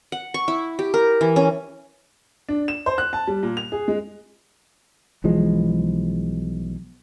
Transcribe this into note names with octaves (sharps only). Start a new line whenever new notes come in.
F#5
C#6
E4
G4
A#4
E3
C#4
D4
E7
C5
F#6
A5
G3
A#2
F7
G#4
G#3
B1 E3 F3 G#3